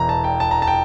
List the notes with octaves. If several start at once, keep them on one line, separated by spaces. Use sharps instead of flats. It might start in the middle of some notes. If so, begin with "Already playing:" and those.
Already playing: E1 E2 E3 A#5
A5
G5
A5
A#5
A5
G5